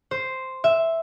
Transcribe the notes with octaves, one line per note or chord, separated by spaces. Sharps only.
C5
E5